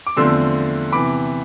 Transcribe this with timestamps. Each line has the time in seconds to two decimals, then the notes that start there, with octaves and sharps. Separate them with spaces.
0.07 D6
0.16 E2 D3 F3 A3 C4 C6 E6
0.92 C3 E3 B3 B5 D6